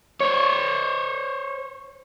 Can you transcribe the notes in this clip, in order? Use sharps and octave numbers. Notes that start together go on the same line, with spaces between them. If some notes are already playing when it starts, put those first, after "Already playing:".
C5 C#5